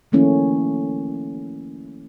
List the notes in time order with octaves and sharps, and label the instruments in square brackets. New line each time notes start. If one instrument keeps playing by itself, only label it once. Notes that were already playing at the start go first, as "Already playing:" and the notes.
[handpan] D#3 F3 A3 A#3 C#4 E4